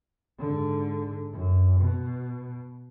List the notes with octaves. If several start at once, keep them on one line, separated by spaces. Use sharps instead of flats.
G#2 D3
F#2
B2